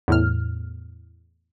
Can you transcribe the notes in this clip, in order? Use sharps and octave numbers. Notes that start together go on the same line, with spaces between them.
E2 A2 F6